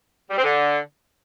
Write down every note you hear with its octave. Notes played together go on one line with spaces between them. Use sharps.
G3
C4
D3